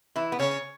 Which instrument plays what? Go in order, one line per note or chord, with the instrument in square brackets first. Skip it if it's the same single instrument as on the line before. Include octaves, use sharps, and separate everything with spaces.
[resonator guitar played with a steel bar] E3 E4
B3
[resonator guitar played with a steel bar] C#3 C#4 [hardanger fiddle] C#5